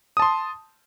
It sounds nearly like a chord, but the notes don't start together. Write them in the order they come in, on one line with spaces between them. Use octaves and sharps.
D#6 A5 C6